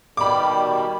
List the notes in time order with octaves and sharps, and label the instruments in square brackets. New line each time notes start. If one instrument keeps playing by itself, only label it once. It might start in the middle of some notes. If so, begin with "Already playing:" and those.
[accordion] B2 D#3 G3 [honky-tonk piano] B5 D6